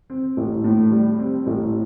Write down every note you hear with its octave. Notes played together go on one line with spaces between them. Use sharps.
C4
A1
A2
G3
C4
A1